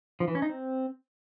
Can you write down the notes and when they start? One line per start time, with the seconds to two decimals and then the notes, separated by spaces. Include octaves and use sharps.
0.20 F3
0.28 E3
0.35 C#4
0.42 D#4
0.49 C4